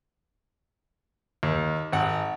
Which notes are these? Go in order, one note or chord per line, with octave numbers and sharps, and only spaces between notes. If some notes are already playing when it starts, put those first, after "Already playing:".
D#2
G#1 F#5